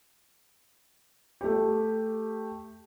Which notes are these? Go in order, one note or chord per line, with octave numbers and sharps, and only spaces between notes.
A3 G4